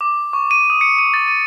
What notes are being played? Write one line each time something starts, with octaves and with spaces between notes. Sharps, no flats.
D6
C#6
D#7
D#6
C#7
D#7
A6
D#7